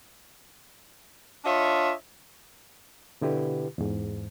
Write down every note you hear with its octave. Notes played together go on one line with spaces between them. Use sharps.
D4 F4 C#5 D#5 E5
B2 D3 E4 G4 B4
E2 G#2